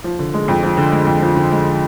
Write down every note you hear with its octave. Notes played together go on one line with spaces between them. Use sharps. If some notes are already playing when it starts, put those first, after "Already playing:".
F3
D3
G#3
F2
F3
D3
G#3
F2
F3
D3
G#3